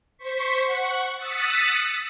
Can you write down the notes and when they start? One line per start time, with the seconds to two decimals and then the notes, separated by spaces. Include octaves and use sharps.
0.17 C5 C#6 B6
0.62 F#5 C#6
1.17 D#6 E6 F#6 A6 B6 C#7